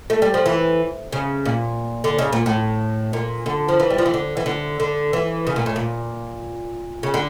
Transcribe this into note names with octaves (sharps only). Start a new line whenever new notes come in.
A3
G3
F3
E3
C#3
A#2
D3
C#3
A#2
A2
A#2
D3
F3
E3
G3
F3
E3
D3
E3
D3
D3
E3
C#3
A#2
A2
A#2
C#3
D3